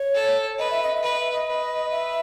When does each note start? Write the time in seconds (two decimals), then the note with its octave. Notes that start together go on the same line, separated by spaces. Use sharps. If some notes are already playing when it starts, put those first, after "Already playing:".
Already playing: C#5
0.14 A4
0.58 B4 D#5
0.70 E5
0.83 D#5
0.95 E5
1.02 B4 D#5
1.20 E5
1.33 D#5
1.47 B4
1.92 E5